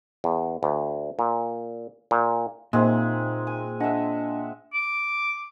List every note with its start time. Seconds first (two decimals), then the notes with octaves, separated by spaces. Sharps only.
0.24 E2
0.63 D2
1.19 A#2
2.11 A#2
2.73 A#2 G#3 A#3 C4 D#4 E5
3.47 G#5
3.80 D4 D#5 E5 F#5 G#5
4.74 D6